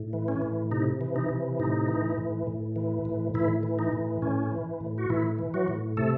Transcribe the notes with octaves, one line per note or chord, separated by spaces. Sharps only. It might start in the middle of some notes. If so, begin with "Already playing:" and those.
Already playing: A2
E3
C#4
A2
C3 D#4
E3
D#4
C3
A2 D#4
E3
A2
A2
E3
A2
A2 E3 E4
E3
D#4
A2
A2 C#4
E3
A2
F#4
A2 E3 E4
E3
F#3 F#4
A2
C3 A3 A4